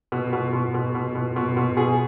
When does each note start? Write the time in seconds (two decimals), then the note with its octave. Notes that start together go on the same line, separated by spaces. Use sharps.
0.12 B2
0.33 B2
0.53 B2
0.74 B2
0.95 B2
1.15 B2
1.36 B2
1.57 B2
1.77 B2 G#4